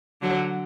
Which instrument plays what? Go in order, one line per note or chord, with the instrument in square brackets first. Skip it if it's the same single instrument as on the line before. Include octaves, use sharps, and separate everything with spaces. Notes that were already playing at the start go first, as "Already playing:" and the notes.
[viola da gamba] D3 F#3